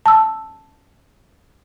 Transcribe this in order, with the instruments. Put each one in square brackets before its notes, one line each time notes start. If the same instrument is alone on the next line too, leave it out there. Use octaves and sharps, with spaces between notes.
[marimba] A5 E6